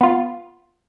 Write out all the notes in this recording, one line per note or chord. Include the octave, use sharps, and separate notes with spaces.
B3 F4